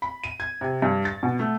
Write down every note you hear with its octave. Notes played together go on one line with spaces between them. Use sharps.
B5
D#7
G#6
C3
G2
A6
B2
A3